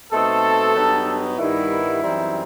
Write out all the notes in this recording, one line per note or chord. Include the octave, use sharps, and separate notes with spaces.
B2 A3 C4 D#4 A4
G2 F#3 B3 D#4
G2 D#3 G3 B3 D#4 E4
F#2 E3 G3 C4 D#4